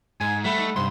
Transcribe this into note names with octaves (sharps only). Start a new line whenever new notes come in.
G#2 G#5
G3 A3 E5 F#5 B5
D#4 D5
G2 C3 C6